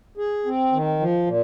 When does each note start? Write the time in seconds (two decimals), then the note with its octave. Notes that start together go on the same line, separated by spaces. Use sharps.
0.17 G#4
0.46 C4
0.72 D#3
1.00 F3
1.26 A#2